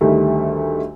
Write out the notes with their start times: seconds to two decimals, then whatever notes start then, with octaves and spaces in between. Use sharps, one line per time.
0.01 D2 D#3 G3 A3